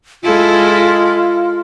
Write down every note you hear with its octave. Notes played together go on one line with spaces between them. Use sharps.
G#3 E4 F4 A4